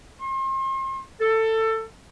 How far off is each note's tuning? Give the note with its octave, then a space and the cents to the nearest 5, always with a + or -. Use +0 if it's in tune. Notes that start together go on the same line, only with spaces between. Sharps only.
C6 +40
A4 +20